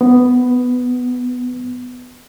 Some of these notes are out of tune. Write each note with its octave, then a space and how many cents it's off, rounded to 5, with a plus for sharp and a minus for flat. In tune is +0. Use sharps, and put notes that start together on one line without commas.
B3 +10